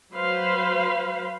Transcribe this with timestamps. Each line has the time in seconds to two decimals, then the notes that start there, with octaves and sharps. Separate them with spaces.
0.15 F#3 B4 C5 F5 B5 C6